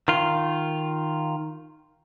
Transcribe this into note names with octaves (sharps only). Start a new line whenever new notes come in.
D#3 F4